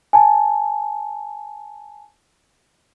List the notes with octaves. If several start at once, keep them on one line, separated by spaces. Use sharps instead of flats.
G#5 A5